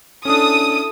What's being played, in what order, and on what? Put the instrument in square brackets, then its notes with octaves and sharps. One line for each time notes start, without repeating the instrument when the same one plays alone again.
[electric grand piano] C#4 D4 [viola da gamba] E4 A4 [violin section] D#6